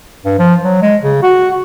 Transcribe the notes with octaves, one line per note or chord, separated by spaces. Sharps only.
G2
F3
F#3
G#3
C#3
F#4